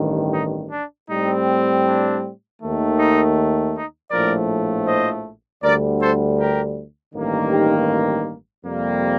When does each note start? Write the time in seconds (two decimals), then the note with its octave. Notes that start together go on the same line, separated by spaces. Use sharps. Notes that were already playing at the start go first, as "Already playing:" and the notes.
Already playing: A1 G2 D#3
0.33 D#4
0.71 D4
1.09 A2 G3 C4 D#4
1.85 D4
2.60 D#2 D#3 A3
2.98 D#4
3.73 D#4
4.11 A#1 A2 F3 A3 A#4 D5
4.86 C5 D#5
5.62 D2 D3 G3 A#4 D5
6.00 A4 C5
6.38 G4 A#4
7.14 A1 G2 D#3 A#3
7.51 D#4 G4
8.65 F2 C3 G3 A#3